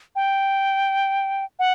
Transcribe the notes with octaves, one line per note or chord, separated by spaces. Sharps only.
G5
F#5